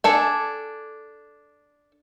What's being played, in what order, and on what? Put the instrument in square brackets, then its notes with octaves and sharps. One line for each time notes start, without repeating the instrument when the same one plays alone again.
[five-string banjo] D4 A4 G#5